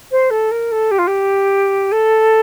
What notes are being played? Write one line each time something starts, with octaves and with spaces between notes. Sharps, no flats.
C5
A4
A#4
A4
G4
F4
G4
A4